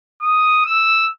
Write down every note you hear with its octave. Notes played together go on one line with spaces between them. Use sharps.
D#6
E6